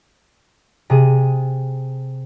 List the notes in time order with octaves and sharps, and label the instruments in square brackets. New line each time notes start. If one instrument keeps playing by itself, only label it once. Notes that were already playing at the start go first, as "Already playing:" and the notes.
[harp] C3 G#4 D#7